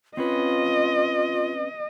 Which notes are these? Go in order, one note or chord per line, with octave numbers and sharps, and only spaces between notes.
C4 C#4 F4 B4 D#5